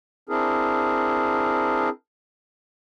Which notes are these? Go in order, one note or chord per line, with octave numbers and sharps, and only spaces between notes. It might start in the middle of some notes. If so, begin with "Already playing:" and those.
C4 D4 E4 G#4 A#4